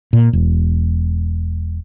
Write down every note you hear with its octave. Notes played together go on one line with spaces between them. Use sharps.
A#2
E1